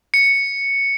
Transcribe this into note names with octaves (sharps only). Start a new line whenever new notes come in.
C#7